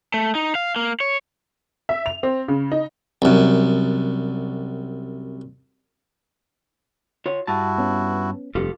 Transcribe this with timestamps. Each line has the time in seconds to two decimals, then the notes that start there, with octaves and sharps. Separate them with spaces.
0.14 A3
0.35 D#4
0.55 F5
0.76 A#3
1.00 C#5
1.89 E5
2.06 F7
2.23 C4
2.48 C#3
2.72 D#4
3.22 C2 F#2
7.26 F4 C#5
7.47 G2 E4 F#4 A5
7.78 B3 C#4
8.55 F1 G2 F4 G4 A4